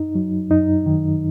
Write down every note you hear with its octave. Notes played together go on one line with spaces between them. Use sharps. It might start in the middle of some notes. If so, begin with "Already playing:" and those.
Already playing: F#2 D#4
F#3
F#2 D#4
D#3